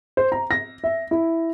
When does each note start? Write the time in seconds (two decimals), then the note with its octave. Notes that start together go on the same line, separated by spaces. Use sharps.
0.17 C5
0.32 A#5
0.51 A#6
0.84 E5
1.11 E4